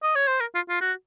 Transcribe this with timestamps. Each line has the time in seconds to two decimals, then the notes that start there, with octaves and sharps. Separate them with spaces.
0.03 D#5
0.16 C#5
0.28 C5
0.40 A#4
0.55 F4
0.69 F4
0.81 F#4